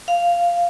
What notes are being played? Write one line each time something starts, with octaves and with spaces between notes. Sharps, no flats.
F5